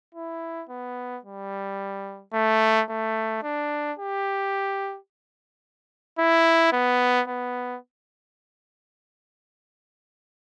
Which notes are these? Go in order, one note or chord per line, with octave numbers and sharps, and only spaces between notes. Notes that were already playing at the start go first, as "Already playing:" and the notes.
E4
B3
G3
A3
A3
D4
G4
E4
B3
B3